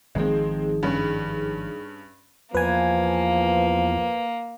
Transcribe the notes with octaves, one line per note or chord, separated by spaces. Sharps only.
G#1 D#3 F3 G#3 C4 D#4 G#4
G2 C#4
E2 F3 A#3 B4 G#5